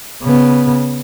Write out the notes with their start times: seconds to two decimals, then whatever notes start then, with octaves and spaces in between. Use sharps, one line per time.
0.23 C#3 B3